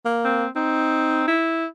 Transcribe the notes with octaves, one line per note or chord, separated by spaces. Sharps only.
A#3
C4
C4 D#4
E4